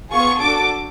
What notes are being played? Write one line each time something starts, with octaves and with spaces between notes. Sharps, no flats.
B3 F4 G#4 C#6
D4 F#4 A4 D6